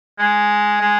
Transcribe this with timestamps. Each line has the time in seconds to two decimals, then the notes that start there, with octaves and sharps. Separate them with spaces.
0.19 G#3
0.81 G#3